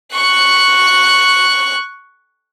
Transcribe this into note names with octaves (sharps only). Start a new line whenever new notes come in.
C#6 F#6